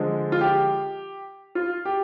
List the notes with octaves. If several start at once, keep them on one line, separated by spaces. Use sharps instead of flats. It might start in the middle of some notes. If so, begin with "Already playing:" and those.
Already playing: D3 F3 G#3
F4
G4
F4
G4